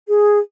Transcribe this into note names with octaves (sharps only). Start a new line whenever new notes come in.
G#4